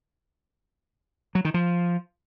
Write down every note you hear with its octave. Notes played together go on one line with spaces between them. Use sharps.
F#3
D#3
F3